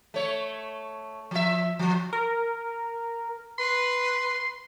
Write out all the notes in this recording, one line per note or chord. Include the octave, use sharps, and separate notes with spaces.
A3 C#5
F3 E5
F3
A#4
B4 C6